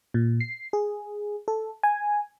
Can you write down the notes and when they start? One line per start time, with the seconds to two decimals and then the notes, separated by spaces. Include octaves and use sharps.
0.14 A#2
0.40 C7
0.73 G#4
1.48 A4
1.83 G#5